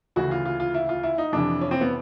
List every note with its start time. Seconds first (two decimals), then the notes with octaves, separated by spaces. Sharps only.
0.16 D2 C#3 E3 F#4
0.31 F4
0.45 F4
0.60 F4
0.74 E4
0.89 F4
1.03 E4
1.18 D#4
1.32 F2 C3 E3 D4
1.61 C#4
1.71 C4
1.81 B3